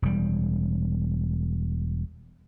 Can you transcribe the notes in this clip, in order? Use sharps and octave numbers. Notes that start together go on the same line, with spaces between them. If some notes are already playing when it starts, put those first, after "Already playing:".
E1 G3